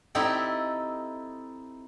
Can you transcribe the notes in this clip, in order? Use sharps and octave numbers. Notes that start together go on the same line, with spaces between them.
C4 D#4 E4 G4 A4